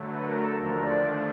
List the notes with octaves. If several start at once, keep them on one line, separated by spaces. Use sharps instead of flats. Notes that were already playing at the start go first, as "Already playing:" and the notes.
Already playing: D3 F#3 A3
B4
A#4
A4
D#2 D3 F3 A3 D4 A#4
D5